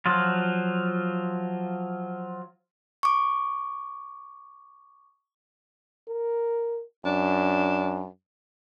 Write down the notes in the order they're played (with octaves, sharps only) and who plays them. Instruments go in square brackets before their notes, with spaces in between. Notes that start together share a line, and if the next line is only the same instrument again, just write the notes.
[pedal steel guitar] F3 F#3 F4
[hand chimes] C#6 D6
[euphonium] A#4
[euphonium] F#2 [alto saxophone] D4